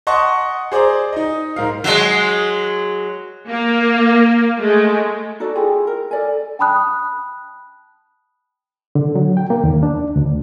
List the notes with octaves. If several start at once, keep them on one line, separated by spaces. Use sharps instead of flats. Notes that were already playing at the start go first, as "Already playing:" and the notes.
D#5 F#5 A5 C6 C#6
G#4 C5 D5 A#5
D#4 D#5
G#2 A#4 F5
F#3 G#3
A#3
G#3 A3
D#4 F#4 A4 D5
E4 F4 G4 G#4
A#4
A4 D5 G#5
G5 A5 B5 D#6 F#6
D3
F#3
G5
A#3
D#2
D4
D2